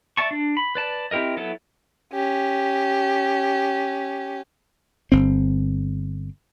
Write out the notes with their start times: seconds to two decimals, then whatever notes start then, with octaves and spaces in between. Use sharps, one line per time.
0.17 D5 E5 A5 C#6
0.31 D4
0.57 B5
0.75 B4 D5 A5
1.11 C4 E4 G4 A#4 D#5
1.37 F#3 B3 E4 A4
2.13 C#4 G4
5.12 G1 C4